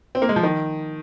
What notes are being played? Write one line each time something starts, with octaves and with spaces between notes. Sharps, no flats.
C4
A#3
G#3
F3
D#3